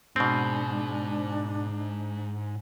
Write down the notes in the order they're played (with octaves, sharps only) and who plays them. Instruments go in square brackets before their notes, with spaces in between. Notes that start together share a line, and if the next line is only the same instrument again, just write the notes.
[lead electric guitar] G#2 [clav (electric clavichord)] B2 C4 [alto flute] D4